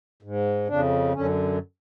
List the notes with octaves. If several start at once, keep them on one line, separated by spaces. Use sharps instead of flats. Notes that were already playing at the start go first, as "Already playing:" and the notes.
G#2
F2 C#3 D4
F#2 D3 C#4